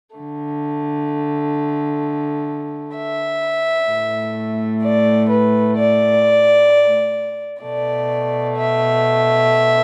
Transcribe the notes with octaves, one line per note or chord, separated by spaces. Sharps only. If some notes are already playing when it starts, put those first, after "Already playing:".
D3 A3
E5
A2 A3
D5
B4
D5
B2 A3 D5
E5